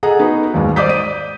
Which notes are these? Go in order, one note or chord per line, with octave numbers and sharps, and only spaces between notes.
G#4 A4 D#5 F#5 A#5
B3 D#4 F#4 B4
D#2 G#2 G3 G#3
C5 D5 D6 D#6 G6 B6
D#7